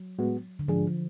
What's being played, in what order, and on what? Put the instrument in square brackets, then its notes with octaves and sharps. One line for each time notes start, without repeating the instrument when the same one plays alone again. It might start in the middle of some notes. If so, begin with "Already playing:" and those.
Already playing: [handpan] F#3
[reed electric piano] A2 G#3 B3 F#4
[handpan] D3
[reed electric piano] G#2 G#3 D4 G#4 [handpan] F3